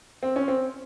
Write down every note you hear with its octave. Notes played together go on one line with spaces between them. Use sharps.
C4
C#4
C4